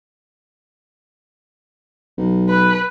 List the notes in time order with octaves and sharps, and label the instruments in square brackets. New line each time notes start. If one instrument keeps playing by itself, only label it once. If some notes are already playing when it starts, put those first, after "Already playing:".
[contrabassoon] B1
[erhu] B4